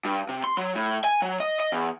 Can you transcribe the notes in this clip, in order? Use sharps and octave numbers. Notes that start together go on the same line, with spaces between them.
G2
C3
C6
F#3
A2
G#5
F#3
D#5
D#5
E2